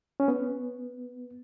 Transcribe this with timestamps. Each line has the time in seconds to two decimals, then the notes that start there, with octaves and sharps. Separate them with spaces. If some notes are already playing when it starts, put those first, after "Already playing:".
0.20 C#4
0.28 B3